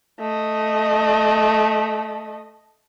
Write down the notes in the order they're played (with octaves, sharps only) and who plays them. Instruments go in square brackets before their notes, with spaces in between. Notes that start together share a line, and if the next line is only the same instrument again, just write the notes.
[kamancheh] A3 D#5